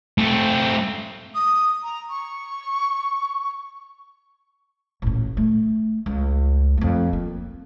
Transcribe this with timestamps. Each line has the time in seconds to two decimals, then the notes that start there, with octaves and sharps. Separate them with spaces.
0.18 A3 C4
1.35 D#6
1.83 A#5
2.10 C#6
5.02 A1 A#2
5.37 A3
6.06 C#2
6.77 F2 A3
7.13 A#3